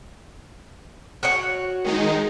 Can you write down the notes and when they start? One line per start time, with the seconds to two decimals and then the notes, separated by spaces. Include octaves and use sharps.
1.23 F#4 C#5 F#5
1.84 D#3 G#3 D#4